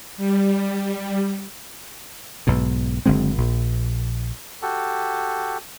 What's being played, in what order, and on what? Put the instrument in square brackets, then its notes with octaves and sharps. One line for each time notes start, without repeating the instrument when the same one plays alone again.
[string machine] G3
[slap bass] B1 G#2 B2
F#1 D3 G#3 C4
A#1
[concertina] F#4 G4 A4